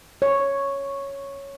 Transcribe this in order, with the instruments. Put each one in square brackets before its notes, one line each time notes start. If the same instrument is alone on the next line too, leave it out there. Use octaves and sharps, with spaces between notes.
[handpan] C#5